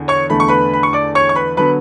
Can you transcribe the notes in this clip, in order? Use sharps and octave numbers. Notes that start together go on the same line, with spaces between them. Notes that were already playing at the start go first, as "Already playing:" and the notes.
Already playing: E2 D3
C#5 C#6
E2 D3 A3 B5
C#6
B4 B5
B5
C#6
D5 D6
C#5 C#6
C#6
B4 B5
D3 F#3 B3 B4 B5